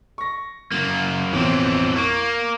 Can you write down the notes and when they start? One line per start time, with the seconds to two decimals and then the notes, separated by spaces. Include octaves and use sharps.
0.18 C#6 A#6
0.72 F#2 A#3
1.33 A1 F2 B2 E3 C4
1.96 A#3 C#6